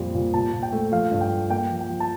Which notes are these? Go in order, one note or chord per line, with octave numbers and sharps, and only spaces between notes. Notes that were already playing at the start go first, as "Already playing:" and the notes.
Already playing: F2 A#2 G3
A#2
A#2 A5
A#2
G5
A3
F3 F5
G2
G5
A3
A#3 G5
F3
G5
F3
A5